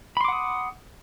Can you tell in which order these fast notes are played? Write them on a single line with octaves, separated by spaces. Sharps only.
B5 C6 D6 F#5 D#6